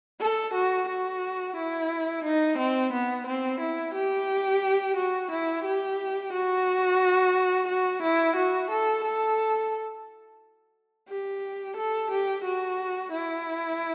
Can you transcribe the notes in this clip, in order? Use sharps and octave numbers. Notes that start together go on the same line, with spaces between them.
A4
F#4
F#4
E4
D#4
C4
B3
C4
E4
G4
F#4
E4
G4
F#4
F#4
E4
F#4
A4
A4
G4
A4
G4
F#4
E4